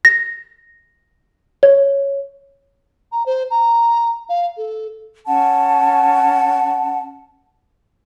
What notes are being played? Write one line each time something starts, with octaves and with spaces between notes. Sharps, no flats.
A#6
C#5
A#5
C5
A#5
F5
A4
C#4 F#5 A5